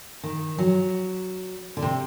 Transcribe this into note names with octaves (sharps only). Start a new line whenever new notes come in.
D#3
F#3
D3
C3